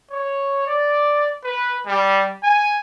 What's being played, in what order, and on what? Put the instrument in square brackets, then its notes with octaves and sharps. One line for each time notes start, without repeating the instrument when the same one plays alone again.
[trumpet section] C#5
D5
B4
G3
G#5